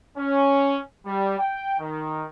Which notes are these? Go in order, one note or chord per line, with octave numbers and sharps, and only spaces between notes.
C#4
G3
G5
D#3